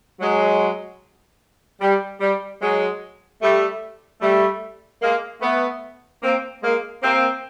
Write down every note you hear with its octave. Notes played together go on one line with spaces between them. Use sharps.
F#3 G#3
G3
G3
F#3 G#3
G3 A3
G3 A3
G#3 A#3
A3 B3
A#3 C4
G#3 A#3
A#3 C4